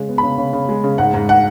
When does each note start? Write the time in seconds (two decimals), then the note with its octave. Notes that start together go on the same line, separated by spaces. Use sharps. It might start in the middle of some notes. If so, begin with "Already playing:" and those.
Already playing: C#3 G#3
0.09 B3
0.18 C#3 B5
0.38 C#3
0.53 C#3
0.69 G#3
0.84 C#3
0.98 G#2 F#5
1.14 G#2
1.29 F#5